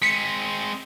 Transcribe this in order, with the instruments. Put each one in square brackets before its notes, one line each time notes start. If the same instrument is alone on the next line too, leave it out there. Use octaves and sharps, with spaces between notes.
[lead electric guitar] G#3 C4 [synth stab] B6 C#7